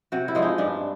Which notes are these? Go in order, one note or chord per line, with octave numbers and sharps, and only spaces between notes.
C3 F#4
E4
F3 G#3 D4
D#4
G2 D4